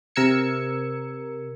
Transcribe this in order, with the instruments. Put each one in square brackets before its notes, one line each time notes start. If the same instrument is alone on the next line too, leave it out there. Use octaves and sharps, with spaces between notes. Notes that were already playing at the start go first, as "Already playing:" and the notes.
[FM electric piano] C3 A#4 E6 G#6 C#7